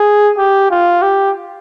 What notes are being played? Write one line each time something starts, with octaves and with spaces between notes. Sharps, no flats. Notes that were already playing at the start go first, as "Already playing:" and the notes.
Already playing: G#4
G4
F4
G4